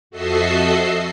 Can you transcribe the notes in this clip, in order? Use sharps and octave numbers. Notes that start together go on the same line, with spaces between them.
F2 F#4 A4 D#5 E5 C7